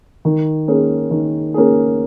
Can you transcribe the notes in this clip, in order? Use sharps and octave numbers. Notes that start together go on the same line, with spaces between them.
D#3
A#3 C#4 G#4
D#3
A#3 C#4 G#4